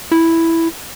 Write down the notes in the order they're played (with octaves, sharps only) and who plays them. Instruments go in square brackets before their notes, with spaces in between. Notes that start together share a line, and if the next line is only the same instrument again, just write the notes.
[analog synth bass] E4